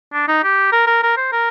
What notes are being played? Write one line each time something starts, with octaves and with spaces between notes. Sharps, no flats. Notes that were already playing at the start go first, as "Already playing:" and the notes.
D4
D#4
G4
A#4
A#4
A#4
C5
A#4